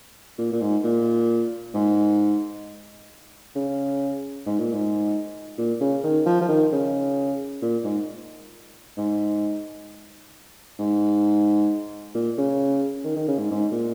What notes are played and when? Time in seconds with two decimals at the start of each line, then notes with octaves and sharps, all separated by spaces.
0.38 A#2
0.52 A#2
0.61 G#2
0.84 A#2
1.74 G#2
3.56 C#3
4.46 G#2
4.59 A#2
4.73 G#2
5.58 A#2
5.81 C#3
6.04 D#3
6.26 F3
6.41 F3
6.48 D#3
6.72 C#3
7.62 A#2
7.84 G#2
8.97 G#2
10.79 G#2
12.15 A#2
12.38 C#3
13.04 D#3
13.16 D#3
13.28 C#3
13.38 G#2
13.51 G#2
13.72 A#2